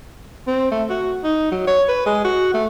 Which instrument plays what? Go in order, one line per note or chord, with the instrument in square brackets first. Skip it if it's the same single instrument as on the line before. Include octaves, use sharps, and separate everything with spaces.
[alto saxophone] C4
A3
F#4
D#4
F#3
C#5
B4
G#3
F#4
A3